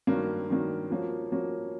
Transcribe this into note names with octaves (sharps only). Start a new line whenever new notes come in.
G2 D#3 F#3 A#3
G2 D#3 F#3 A#3
F3 A#3 C#4 F#4
F3 A#3 C#4 F#4